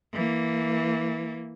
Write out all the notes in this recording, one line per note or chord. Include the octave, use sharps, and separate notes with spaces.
E3 A#3